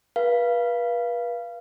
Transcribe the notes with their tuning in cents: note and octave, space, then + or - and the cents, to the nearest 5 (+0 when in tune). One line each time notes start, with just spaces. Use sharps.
B4 -35 F5 -25